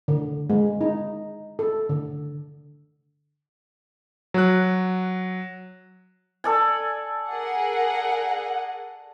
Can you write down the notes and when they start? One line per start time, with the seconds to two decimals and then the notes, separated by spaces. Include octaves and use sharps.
0.08 D3
0.50 G#3
0.81 D#4
1.59 A4
1.89 D3
4.34 F#3 F#6
6.44 A4 D5 G#5
7.31 G#4 A#4 F#5